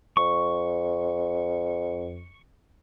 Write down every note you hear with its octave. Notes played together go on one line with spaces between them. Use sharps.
F2 C#6